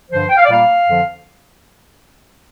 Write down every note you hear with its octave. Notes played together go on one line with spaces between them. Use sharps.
G2 D3 F3 C5
G5
F5
D5
A#2 G3 A#3 F5
F2 D3 F3